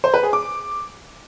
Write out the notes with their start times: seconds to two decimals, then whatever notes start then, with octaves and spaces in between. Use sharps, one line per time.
0.04 C5
0.14 B4
0.23 G#4
0.33 D6